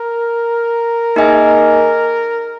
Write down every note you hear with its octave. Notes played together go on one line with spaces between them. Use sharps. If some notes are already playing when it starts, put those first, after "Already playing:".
Already playing: A#4
A#3 D#4 G#4 D#5 G#5